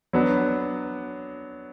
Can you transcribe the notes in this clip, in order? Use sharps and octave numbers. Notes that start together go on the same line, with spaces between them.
F#3 B3 D4